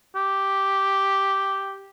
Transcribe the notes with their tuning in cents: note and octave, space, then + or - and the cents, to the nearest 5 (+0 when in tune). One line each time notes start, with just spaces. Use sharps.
G4 -5